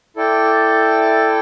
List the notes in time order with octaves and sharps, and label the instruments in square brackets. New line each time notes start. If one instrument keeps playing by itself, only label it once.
[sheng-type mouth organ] E4 A4 D5 G5